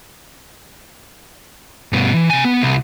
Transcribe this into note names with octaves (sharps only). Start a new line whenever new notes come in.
G2 B2
E3
C3 G#5
B3
C2